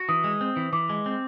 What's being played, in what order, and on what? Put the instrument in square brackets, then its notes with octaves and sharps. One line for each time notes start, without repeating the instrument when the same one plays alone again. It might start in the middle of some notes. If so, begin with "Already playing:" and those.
Already playing: [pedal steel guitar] F#4
[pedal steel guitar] E3 [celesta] D#6
[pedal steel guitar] G#3
C4
E3
[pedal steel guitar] E3 [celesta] D6
[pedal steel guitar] G#3
C4